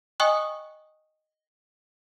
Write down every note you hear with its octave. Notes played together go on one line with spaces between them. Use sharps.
D#5 G5 G#5 C#6 D#6 F#6